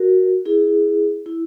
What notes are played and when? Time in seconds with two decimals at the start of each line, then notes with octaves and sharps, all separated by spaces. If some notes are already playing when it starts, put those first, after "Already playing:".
Already playing: F#4 A#4
0.46 E4 G#4
1.26 E4